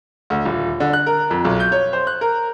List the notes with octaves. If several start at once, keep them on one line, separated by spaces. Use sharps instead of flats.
D2
D#1
D3
F#6
A#4
F2
B1
G6
C#5
C5
F#6
A#4